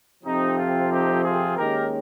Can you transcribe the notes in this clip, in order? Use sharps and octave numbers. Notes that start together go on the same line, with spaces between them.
F2 C3 F3 C4 D#4
F4
D#4 G4
F4 G#4
D#2 D#3 G#3 C#4 G4 A#4